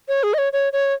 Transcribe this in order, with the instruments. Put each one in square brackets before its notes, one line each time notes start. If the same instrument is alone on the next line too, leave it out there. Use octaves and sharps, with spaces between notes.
[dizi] C#5
G#4
D#5
C#5
C#5
C#5